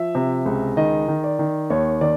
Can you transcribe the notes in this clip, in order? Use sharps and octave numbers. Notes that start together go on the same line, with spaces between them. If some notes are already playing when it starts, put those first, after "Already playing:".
Already playing: F3 E5
C3
C#2
D#3 D#5
D#3
D5
D#3
D#2 C#5
D#3 D5